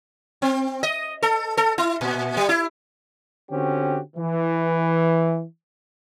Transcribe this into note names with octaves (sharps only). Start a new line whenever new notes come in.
C4
D#5
A4
A4
E4
A#2
G3
E4
D3 C4 C#4 F#4 G4
E3